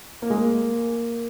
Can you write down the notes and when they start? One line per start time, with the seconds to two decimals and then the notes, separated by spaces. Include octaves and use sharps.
0.22 A#3
0.30 G#3
0.37 A#3